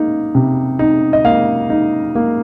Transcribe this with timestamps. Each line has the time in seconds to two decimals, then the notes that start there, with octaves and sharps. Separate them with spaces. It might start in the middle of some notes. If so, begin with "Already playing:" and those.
Already playing: A#3 D#4
0.35 C3
0.79 D#4
1.13 D#5
1.25 A#3 F5
1.70 D#4
2.15 A#3